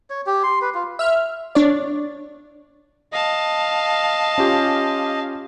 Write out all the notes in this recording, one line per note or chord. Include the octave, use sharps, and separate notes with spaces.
C#5
G4
C6
B4
F4
E5 F6
D4 C#5 D5
D#5 F5 A5
C#4 F4 G4